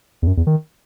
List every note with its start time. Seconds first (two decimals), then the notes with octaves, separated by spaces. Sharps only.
0.22 E2
0.27 F#2
0.37 E2
0.47 D#3